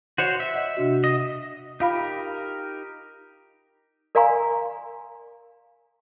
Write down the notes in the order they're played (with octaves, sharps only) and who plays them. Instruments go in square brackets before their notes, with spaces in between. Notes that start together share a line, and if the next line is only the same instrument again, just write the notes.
[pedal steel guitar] F#4 C5 C#5
E5
[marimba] D#5 F#5
C3 D4 F#4
[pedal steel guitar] D#5
[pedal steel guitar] D#4 G4 A#4 [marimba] F4 F5 B5
[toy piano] A#4 D5 F5 G#5 A#5 C6